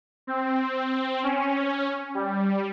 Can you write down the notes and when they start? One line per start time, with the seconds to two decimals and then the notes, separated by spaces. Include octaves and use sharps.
0.27 C4
1.24 C#4
2.15 G3